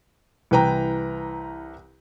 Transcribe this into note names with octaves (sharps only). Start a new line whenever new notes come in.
C2 E3 B4 G5 A#5